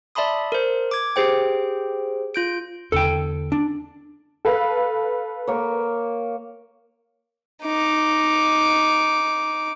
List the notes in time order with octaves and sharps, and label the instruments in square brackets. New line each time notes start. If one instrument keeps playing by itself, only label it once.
[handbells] D5 E5 A5 B5 C6 D#6
A#4 C5
D6 G#6
G4 G#4 C5 G5
F4 G6 D7
[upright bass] E2 D3 [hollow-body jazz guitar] A4 G5
[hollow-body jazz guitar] D4
[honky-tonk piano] A4 B4 F5
[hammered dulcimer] A#3 C#5
[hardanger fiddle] D#4 D6